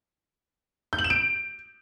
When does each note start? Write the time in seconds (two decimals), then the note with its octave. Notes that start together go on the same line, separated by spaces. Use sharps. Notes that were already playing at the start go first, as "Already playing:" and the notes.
0.93 G6
0.99 F#7
1.04 E7
1.10 D7